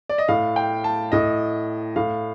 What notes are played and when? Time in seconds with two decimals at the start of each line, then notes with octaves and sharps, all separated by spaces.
0.09 D5
0.18 D#5
0.28 A2 F5
0.56 G5
0.84 A5
1.12 A2 D#5
1.96 A2 F5